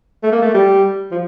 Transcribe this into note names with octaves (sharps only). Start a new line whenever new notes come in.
A3
A#3
A3
G3
F3